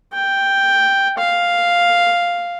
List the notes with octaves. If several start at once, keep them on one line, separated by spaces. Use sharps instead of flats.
G5
F5